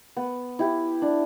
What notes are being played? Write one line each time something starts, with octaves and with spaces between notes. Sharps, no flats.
B3
E4 G4
D4